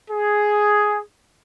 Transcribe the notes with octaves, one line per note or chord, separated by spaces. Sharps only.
G#4